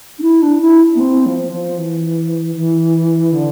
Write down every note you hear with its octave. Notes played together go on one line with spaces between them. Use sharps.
D4
E4
D4
E4
B3
C4
F3
F3
E3
E3
D3